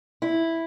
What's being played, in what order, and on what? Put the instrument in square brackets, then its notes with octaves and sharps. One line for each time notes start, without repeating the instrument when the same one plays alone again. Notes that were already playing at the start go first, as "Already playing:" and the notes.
[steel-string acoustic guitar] E4